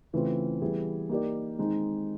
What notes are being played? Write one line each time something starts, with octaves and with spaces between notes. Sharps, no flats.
C#3 E3 A3 C4 F4
E3 G3 B3 E4 G#4
A#3 D#4 G4 A#4 D5
D#3 G#3 C4 D#4